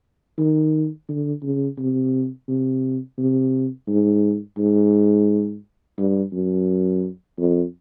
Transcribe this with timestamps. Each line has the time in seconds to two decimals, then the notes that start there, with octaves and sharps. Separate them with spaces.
0.38 D#3
1.09 D3
1.43 C#3
1.78 C3
2.49 C3
3.18 C3
3.88 G#2
4.58 G#2
5.98 G2
6.33 F#2
7.39 F2